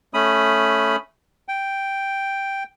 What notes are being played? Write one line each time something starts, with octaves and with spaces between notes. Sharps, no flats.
A3 C#4 B5 D#6
G5